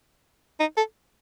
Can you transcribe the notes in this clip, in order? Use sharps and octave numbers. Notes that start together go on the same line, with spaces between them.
D#4
A4